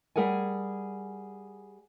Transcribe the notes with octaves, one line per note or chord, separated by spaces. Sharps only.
G3 G#4 A#4 F#5 G#5